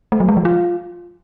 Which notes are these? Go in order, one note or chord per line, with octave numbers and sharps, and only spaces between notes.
A3
F#3
G#3
F3
F4